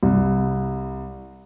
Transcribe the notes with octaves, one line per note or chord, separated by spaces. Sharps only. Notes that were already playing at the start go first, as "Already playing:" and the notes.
C2